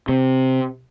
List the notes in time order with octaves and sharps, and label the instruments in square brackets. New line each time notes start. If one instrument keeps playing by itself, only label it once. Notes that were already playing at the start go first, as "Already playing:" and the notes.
[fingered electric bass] C3